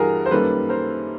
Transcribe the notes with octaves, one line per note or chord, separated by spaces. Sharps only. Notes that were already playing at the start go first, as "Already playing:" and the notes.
Already playing: G2 E3 G3 F#4 G#4 A#4
C5
F#2 D#3 G3 A#3 A4 B4
A#4 C5